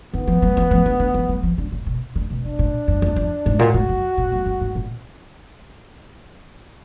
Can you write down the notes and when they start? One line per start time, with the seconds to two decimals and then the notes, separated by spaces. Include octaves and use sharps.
0.14 D#3 B3
0.27 F3
0.42 F#3
0.57 F3
0.71 F3
0.86 D3
1.00 D3
1.14 F3
1.29 F#3
1.43 F3
1.58 D3
1.72 A#2
1.86 B2
2.15 D3
2.30 B2
2.45 B2 D4
2.59 A#2
2.88 F#2
3.02 F2
3.16 F2
3.46 G#2
3.59 A#2 F#4
3.74 G#2
3.89 F#2
4.18 A#2
4.32 F#2
4.46 F#2
4.61 G#2
4.75 A#2